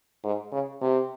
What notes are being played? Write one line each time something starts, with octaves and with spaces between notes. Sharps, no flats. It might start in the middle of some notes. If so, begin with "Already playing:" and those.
G#2
C#3
C3